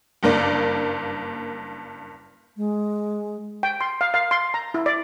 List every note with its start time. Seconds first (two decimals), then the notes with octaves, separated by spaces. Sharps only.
0.23 F#1 G2 A#3 D5
2.57 G#3
3.63 G5
3.81 C6
4.01 F5
4.14 F5
4.31 C6
4.54 A#5
4.74 E4
4.86 D5